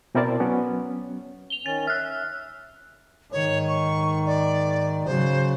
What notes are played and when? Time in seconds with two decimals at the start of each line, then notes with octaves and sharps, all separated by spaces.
0.15 B2 C4 E4 A#4 D5 A5
0.40 F#3 B3 C#4
1.50 F7 G7
1.66 D#3 C#4 A6
1.87 E5 F6 F#6
3.32 G#2 D#3 C#5
3.68 C#6
4.26 D5
5.05 C#3 F#3 C5